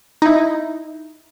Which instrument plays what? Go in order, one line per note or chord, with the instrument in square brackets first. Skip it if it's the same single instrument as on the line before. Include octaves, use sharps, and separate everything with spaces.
[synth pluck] D#4 E4